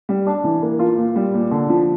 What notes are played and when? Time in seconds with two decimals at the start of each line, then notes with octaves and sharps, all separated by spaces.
0.09 G3
0.27 D4
0.44 E3
0.62 A#3
0.79 F4
0.97 A#2
1.16 G3
1.34 A#2
1.51 D3
1.69 F3